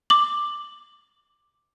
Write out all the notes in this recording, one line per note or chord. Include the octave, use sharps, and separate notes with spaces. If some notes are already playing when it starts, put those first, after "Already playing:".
D6 F#7